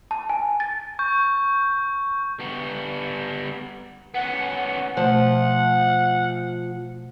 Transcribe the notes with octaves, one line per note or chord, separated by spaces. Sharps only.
A5
G#5
A6
C#6 G6
G3 B3
B3 C#4 F#5
B2 F3 A3 F#5